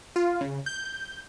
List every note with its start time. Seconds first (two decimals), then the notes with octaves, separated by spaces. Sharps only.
0.16 F4
0.41 C#3
0.66 G6